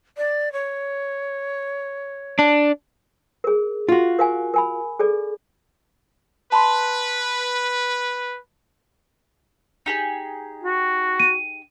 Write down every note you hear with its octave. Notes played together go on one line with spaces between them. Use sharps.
D5
C#5
D4
G#4 A#4
F4 F#4
A#4 F5 G#5
A#4 G#5 B5
G#4 A4 D5
B4 A5 B5 C6
D#4 G4 G#4
F#4
D#7